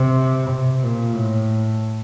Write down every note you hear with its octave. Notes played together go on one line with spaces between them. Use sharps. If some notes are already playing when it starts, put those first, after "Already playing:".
Already playing: C3
C3
A#2
A2